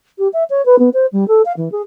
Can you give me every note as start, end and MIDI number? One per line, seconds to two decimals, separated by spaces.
0.18 0.28 67
0.33 0.44 76
0.50 0.64 73
0.66 0.79 71
0.79 0.90 59
0.94 1.06 72
1.12 1.27 55
1.28 1.42 69
1.45 1.53 77
1.57 1.71 52
1.72 1.82 68